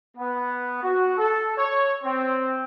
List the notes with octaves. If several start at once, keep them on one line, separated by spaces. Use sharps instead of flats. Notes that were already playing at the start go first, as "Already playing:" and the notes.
B3
F#4
A4
C#5
C4